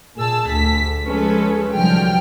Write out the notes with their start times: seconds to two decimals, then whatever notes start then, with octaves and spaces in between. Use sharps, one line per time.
0.17 A#2 G#4 A5 E6
0.50 D2 B6
1.06 F3 G#3 C#4 A4 B4
1.71 C2 D3 F3 F#3 G5 F6